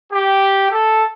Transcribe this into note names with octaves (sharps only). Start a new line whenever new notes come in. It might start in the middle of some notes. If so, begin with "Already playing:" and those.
G4
A4